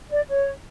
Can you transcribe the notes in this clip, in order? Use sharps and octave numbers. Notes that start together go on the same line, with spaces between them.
D5
C#5